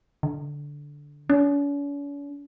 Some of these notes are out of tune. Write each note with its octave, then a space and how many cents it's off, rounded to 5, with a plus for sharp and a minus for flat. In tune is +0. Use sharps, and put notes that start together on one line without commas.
D3 -10
C#4 +45